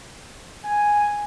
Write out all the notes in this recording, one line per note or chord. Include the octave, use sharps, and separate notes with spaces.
G#5